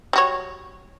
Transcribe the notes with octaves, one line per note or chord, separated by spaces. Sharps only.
G3 F#4 C#5